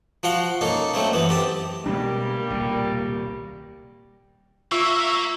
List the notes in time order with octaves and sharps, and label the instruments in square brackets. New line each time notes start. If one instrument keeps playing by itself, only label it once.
[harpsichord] F3 F#4 F5 C6
A#3 C#4 D#4 A4
F#3 A3 C4 C#4
F#2 E3 B3
C4 G4 A5
[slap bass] B2 G#3 D4 [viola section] G3 [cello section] A#3
[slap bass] D#1 C2 B2
[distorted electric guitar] A#3 [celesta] F4 [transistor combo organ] E5 [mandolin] C#6